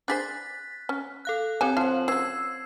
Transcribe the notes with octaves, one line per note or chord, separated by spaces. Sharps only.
D4 G#4 C5 F#6 A6 B6
C#4
A4 F5 F#6
C4 G4 C#5 G#5
F3 F5 F#5
C#3 E3 E6 G#6 C7